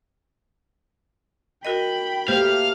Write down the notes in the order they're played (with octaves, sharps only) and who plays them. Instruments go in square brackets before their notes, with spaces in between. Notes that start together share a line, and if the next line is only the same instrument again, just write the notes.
[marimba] F#4 A#4 D#5 [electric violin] G5 B5
[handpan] A3 A#3 C5 [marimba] G4 [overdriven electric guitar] F5